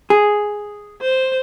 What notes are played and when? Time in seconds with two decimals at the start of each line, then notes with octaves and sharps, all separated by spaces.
0.10 G#4
1.01 C5